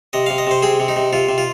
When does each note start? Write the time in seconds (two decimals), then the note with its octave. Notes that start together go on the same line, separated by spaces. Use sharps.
0.13 C3 D#5
0.26 C3 F5
0.38 D#5
0.47 C3 C5
0.63 C4 G#4
0.80 C3
0.88 D#4
0.96 C3
1.13 C3 F4
1.29 C3
1.38 F4